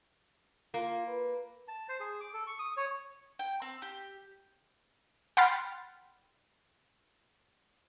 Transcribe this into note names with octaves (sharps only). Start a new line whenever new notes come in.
A#3 F4
B4
A5
C5
G#4
D6
A4
C#6
D#6
C#5
G5
C4
G4
F#5 G5 B5 C6 F6 A6